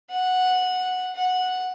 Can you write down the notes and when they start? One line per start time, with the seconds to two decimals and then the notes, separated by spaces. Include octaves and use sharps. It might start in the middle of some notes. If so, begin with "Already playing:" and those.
0.11 F#5
1.15 F#5